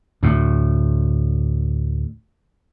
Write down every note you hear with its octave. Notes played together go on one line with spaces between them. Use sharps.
D2 A2